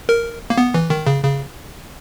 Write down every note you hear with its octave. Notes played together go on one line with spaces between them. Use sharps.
A#4
A#3
B3
E3
D#3
C#3
C#3